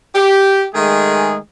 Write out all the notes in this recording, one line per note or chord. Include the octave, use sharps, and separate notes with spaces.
G4
D#3 G#3 A3 G#4